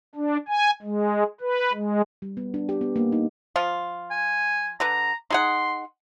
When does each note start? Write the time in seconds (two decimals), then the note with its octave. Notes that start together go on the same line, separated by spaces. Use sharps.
0.15 D4
0.48 G#5
0.83 G#3
1.41 B4
1.73 G#3
2.22 G3
2.37 B3
2.54 D4
2.69 G4
2.81 B3
2.96 A#3
3.12 D#4
3.56 F3 F4
4.11 G#5
4.80 D3 B4 A#5
5.30 D#4 G#4 F#5 C6